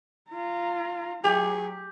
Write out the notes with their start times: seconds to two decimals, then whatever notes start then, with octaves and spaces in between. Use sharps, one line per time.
0.30 F4 A#5
1.24 F#3 G4 G#4